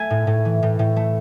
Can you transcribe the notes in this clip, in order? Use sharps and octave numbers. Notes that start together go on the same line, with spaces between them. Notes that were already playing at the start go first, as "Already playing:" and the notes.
Already playing: A3 G#5
A2
A2
E3
A2
A2
A3